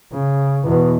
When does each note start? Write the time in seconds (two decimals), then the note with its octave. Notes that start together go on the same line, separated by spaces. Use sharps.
0.13 C#3
0.64 E2 B2